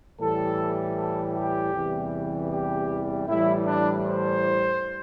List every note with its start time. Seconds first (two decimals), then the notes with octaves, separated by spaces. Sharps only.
0.21 A2 E3 G3 A4
0.97 A4
1.35 G4
1.74 E2 C3 E3 G3
2.51 G4
3.27 A2 E3 G3 E4
3.65 D4
4.04 C5